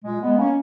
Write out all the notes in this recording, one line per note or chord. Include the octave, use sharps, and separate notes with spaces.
A#2 G#3
G#3 B3
A#3 C#4